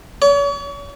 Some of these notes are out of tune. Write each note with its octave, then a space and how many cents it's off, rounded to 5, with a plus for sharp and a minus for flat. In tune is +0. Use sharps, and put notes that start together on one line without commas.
C#5 +40